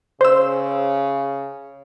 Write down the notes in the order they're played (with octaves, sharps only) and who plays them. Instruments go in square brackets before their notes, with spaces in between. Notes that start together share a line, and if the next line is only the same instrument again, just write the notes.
[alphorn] C#3 [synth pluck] C5 E6